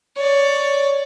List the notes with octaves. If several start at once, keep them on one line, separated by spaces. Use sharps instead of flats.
C#5 D5